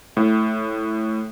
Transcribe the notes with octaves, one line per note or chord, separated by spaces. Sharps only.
A2